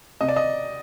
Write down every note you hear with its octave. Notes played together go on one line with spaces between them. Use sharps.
C3 D#5
D5
D#5